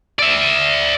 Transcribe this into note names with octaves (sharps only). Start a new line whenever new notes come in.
D5 E5